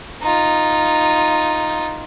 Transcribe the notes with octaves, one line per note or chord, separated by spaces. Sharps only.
D#4 F4